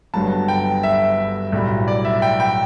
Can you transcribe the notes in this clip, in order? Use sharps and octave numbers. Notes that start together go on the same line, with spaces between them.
G1 G2 F#3 A5
G5
E5
B1 A2 G3
D5
E5
G5
G5